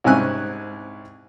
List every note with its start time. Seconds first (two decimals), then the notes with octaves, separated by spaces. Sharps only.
0.04 C2 G#2 C#4 G#5 F#6